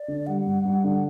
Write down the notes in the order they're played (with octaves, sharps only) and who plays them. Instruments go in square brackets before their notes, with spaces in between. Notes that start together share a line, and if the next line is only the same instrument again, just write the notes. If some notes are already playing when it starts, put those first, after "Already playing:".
Already playing: [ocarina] D5
[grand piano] D3
[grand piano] G3 [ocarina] F#5
[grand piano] G2
G2
D3